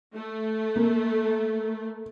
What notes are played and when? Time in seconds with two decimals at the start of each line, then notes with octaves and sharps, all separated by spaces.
0.14 A3
0.76 A#3